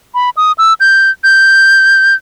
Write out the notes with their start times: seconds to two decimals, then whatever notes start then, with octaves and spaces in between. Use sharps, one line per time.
0.15 B5
0.37 D#6
0.58 E6
0.80 G6
1.24 G6